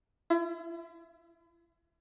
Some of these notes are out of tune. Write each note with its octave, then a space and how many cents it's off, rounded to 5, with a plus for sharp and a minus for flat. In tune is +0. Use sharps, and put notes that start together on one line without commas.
E4 +45 E5 +0